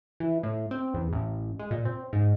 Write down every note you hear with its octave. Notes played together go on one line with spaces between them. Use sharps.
E3
A2
C4
E2
A1
G#3
A#2
C4
G#2